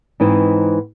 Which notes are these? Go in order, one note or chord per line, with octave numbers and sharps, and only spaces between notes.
G#2 E3 C4 D#4 B4 C5